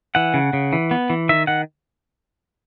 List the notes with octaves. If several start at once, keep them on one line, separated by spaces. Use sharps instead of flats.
E3 F#5
C#3
C#3
E3
B3
E3
D#3 E5
D#3 F#5